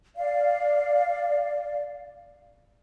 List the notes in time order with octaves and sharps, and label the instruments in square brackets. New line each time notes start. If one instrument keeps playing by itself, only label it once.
[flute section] D5 F5